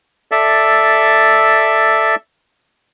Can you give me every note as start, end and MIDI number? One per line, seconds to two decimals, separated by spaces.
0.32 2.15 69
0.32 2.15 74
0.32 2.15 76